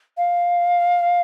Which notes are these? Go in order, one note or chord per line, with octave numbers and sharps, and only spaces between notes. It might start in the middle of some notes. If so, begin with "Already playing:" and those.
F5